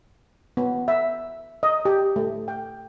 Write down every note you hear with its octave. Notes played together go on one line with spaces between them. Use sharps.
B3
E5
D#5
G4
A3
G5